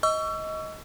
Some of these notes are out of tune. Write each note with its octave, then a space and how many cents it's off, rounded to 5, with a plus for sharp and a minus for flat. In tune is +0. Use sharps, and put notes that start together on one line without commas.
D#5 +20 C#6 +30 E6 +30